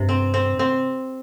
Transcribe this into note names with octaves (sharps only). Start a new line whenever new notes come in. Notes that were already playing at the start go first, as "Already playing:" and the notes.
Already playing: G2 C3
C4
C4
C4